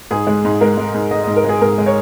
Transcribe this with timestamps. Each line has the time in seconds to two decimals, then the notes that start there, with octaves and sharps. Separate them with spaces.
0.11 G#2 G#4
0.27 G#3
0.45 G#2
0.61 G#3 A#4
0.77 G#3
0.94 G#2
1.11 G#3 D#5
1.24 D#5
1.27 G#2
1.36 A#4
1.44 G#3 G#4
1.61 G#2 A#4
1.78 G#3
1.86 C#5